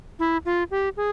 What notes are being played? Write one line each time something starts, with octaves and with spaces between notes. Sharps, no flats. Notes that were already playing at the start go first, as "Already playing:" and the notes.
E4
F4
G4
G#4